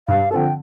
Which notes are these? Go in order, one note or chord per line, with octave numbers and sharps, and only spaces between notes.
G2 F5
D3 F3 C4 A4 G5 A5